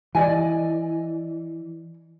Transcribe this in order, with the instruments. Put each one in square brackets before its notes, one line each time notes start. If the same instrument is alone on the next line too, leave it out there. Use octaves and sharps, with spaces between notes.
[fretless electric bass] E3 [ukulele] D5 D#5 G#5